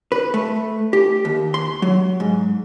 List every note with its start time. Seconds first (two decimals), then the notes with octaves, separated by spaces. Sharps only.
0.12 B4
0.34 A3
0.93 G4
1.25 D#2
1.54 C6
1.82 F#3
2.20 G#2